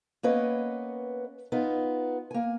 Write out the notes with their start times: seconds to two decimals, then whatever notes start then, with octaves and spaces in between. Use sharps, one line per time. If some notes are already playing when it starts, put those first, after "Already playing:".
0.23 A#3 B3 C#4 B4 D#5
1.52 B3 D#4 F4
2.31 A#3 G#5